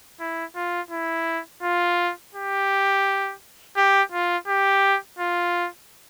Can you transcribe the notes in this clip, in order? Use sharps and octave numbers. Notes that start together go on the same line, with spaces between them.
E4
F4
E4
F4
G4
G4
F4
G4
F4